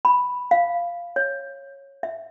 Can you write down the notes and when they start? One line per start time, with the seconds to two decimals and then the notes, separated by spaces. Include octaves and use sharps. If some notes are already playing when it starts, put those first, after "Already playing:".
0.05 B5
0.51 F5
1.16 C#5
2.03 E5